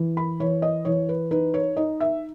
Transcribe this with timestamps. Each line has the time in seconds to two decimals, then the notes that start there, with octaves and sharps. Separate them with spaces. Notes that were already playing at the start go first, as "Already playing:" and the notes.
Already playing: E3
0.17 B5
0.40 E3 C#5
0.62 D#5
0.85 E3 C#5
1.09 B4
1.31 D#4 B4
1.54 C#5
1.77 D#4 D#5
2.00 E5